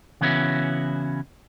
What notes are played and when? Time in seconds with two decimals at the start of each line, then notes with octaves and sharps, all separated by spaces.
0.21 C#3 E3 B3 C#4 E4 F#4